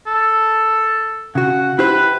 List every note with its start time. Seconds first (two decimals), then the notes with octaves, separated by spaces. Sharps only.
0.07 A4
1.35 C#3 F#4 F#5
1.79 E4 G4 B4 C5